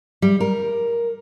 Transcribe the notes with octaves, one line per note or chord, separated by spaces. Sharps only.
G3
A#4